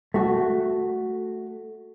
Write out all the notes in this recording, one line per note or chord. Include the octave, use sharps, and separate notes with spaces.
A3 F#4